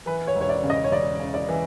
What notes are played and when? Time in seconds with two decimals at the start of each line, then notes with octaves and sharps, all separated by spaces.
0.06 E3 B4
0.27 C#5
0.35 E1
0.41 C#5
0.49 D5
0.63 C#3
0.70 D#5
0.84 C#5
0.91 E1 D5
1.19 C#3
1.34 D5
1.49 E3